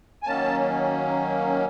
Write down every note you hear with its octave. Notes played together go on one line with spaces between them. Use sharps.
G#5
D#3 F#3 A#3 C#4 A5